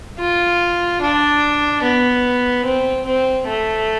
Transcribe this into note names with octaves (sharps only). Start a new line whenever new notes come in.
F4
D4
B3
C4
C4
A3